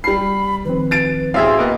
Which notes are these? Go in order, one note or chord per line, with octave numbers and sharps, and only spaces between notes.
G3 B5 C7
D#3 F3 C4 B4
A6 D7
A1 F#4 G#4 C5 E5 F5 C6 E6
A#3 B3 D#5